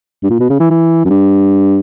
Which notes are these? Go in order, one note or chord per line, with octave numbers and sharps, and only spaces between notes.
G2
A#2
B2
C#3
E3
E3
F#2
G2